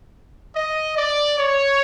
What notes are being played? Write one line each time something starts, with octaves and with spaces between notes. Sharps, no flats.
D#5
D5
C#5